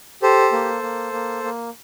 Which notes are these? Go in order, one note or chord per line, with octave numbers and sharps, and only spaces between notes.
G4 A4 C5
A#3
A#3
A#3
A#3